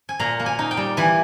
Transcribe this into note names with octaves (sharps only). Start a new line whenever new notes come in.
G#5
A#2 A#5
A#3
G#5
D#4
G5
G3
E3 G#5